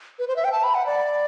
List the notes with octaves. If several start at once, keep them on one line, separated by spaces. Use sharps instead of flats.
B4
C5
E5
G5
A5
B5
F#5
D5